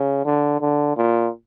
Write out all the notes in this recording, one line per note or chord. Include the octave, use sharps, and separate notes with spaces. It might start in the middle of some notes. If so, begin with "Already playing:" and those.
Already playing: C#3
D3
D3
A#2